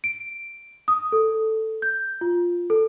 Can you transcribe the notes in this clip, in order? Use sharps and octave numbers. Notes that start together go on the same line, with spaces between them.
D7
D#6
A4
G6
F4
A4